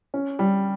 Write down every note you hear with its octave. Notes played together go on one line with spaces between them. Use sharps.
C#4
G3